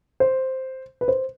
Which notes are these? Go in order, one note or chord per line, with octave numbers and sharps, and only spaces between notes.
C5
B4
C5